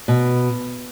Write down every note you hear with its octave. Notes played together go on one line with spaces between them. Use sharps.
B2